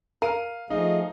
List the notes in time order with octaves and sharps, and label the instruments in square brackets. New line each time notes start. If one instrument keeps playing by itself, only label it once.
[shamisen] A#4 [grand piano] F5 D#7
[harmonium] F3 A3 G#4 [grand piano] D#4 F5 [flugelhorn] D#5